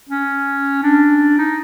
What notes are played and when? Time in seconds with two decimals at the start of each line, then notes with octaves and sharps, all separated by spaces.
0.09 C#4
0.83 D4
1.38 D#4